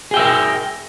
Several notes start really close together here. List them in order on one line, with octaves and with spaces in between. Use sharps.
G#4 G5 E5 A#4